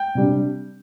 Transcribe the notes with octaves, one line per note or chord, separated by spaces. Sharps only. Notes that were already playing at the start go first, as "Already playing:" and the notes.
Already playing: G5 G6
C3 G3 D4